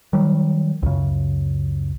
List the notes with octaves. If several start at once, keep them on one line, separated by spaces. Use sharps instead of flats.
D#3 F#3 G3
C#2 F#2 C#3